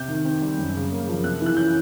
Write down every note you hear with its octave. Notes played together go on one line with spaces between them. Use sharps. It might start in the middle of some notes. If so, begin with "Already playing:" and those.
Already playing: C3 G6
D#3
C4
G3
F#2
C#3
A#3
F3
C3 F#6
E3
F#6
C#4 G6